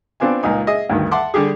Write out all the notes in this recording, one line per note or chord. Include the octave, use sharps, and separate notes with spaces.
B3 C4 D4 F4 G#5
C#2 A#2 D#4 G#5
G#4 D#5 E5
D2 G2 D#3
E5 F#5 A5 C6 D6
D3 G3 G4 G#4